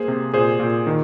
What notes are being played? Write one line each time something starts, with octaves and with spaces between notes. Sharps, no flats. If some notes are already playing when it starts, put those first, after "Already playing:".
Already playing: A#3 G#4 C5
C3
A#2 G#4 C5
A#2
D#3